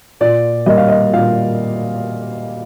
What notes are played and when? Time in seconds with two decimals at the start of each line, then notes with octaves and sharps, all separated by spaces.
0.21 A#2 D5
0.66 G3 A#3 D#5
0.77 F5
0.88 D#5
1.13 A#2 F5